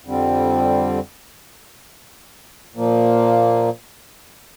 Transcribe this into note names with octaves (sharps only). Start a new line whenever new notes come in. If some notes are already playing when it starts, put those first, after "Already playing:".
F2 D3 G3 C4
A#2 F3 A#3